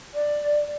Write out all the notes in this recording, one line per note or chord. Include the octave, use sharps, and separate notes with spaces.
D5